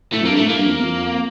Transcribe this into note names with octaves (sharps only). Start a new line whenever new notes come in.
A2 A3
F2
A#3
G2
A2 A3
A#3
G2
F2
E2
F2